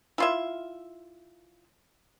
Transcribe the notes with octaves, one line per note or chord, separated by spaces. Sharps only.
E4 F4 E5